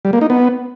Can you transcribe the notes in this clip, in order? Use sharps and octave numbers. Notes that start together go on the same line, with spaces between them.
G3
A#3
D#4
B3